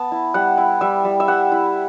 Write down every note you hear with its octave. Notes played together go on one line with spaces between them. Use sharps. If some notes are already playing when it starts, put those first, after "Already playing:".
Already playing: B3 A5
E4
G3 F#5
E4
G3 E5
G3
E5
G3 F#5
E4